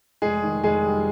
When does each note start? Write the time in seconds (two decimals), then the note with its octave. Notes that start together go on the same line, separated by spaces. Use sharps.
0.22 F1 G#3 G#4
0.43 D#3
0.63 F1 G#3 G#4
0.85 G3